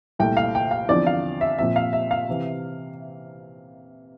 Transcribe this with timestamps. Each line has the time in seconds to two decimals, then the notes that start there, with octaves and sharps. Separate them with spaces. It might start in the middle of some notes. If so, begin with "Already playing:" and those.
0.19 C2 A#2 A3 G5
0.37 F5
0.55 G5
0.71 F5
0.88 E2 D3 F3 C4 D5
1.07 F5
1.41 E5
1.58 A#2 F3 C4 E5
1.76 F5
1.93 E5
2.11 F5
2.29 C3 E3